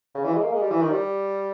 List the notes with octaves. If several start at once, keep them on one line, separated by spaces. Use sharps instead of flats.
C#3
E3
G#3
A#3
G#3
G3
E3
D#3
G3